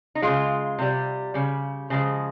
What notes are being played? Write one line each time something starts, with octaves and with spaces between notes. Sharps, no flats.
D#4
C#3 G#3 F4
C3 G3
C#3 G3
C#3 F3 G#3